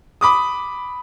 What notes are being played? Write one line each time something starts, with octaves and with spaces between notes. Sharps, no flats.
B5 D6 D#6